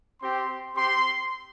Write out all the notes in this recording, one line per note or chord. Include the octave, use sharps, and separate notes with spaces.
C4 G4 C6
C4 G4 C6